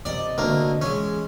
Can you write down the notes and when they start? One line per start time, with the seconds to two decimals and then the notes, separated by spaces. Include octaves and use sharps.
0.05 C3 D5 D#5
0.38 D2 A#3
0.82 E3 G#3 C#4